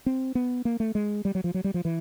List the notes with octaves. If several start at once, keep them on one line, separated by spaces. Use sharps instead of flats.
C4
B3
A#3
A3
G#3
G3
F#3
F3
F#3
G3
F3
E3